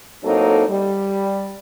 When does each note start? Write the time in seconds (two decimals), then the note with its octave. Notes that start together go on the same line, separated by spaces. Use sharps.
0.24 A2 F#3 A#3 C4 D#4 A4
0.68 G3